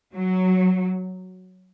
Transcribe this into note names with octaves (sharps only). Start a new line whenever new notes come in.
F#3